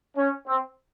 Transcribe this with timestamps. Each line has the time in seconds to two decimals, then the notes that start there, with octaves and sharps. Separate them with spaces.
0.16 C#4
0.46 C4